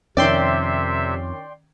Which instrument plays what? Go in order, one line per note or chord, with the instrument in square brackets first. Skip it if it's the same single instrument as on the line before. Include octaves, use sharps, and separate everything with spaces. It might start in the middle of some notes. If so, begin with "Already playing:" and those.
[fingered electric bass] F2 [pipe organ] C3 E5 [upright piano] D#3 C#4 [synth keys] D5 G5 C6